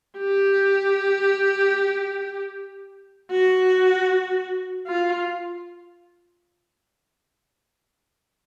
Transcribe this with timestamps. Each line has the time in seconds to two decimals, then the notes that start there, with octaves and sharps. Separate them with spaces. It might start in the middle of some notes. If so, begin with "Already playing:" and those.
0.19 G4
3.31 F#4
4.87 F4